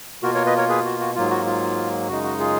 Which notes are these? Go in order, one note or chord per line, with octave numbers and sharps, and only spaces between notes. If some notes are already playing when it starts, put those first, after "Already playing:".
B2 A#3 F4 F#4 A#4
A#4 C#5
B4 D#5
A#4 C#5
G#4 B4
F#4
F#4
G#2 F#3 A#3 F4
F#4
F4
F#2 C#3 G#3 D#4 F#4
F#4
F4 G#4